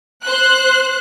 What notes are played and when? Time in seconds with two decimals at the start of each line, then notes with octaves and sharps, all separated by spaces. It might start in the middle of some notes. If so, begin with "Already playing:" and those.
0.25 C5 F#6